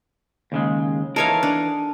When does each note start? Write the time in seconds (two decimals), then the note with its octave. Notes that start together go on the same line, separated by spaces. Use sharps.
0.52 D#2 C#3 G#3
1.16 E3 D#4 A4 A#4 C#5 F5
1.43 D4